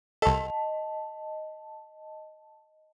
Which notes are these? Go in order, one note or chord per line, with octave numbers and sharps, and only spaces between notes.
C2 A4 D#5 A5